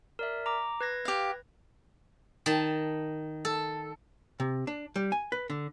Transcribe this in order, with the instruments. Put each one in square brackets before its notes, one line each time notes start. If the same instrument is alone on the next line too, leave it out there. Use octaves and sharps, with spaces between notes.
[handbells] A#4 D5 E5
A#5 D6
B4 G#6 A#6
[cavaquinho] G4 F5
[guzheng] D#3 A5
A4
[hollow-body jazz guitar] C3
D4
G3
G#5
B4
D3